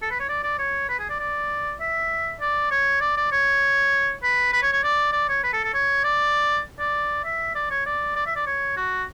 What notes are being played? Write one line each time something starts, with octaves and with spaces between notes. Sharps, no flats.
A4
B4
C#5
D5
D5
C#5
B4
G#4
D5
D5
E5
D5
C#5
D5
D5
C#5
B4
B4
C#5
C#5
D5
D5
C#5
B4
A4
A4
C#5
D5
D5
E5
D5
C#5
D5
D5
E5
D5
C#5
F#4